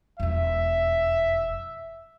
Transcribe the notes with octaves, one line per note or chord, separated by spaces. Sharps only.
E1 F2 E5